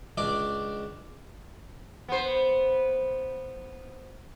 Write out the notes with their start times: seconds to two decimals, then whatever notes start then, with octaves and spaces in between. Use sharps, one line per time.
0.18 C#2 D4 D5
2.08 B3 C5